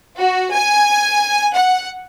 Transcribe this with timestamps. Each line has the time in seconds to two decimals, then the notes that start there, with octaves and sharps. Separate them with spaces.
0.17 F#4
0.51 G#5
1.53 F#5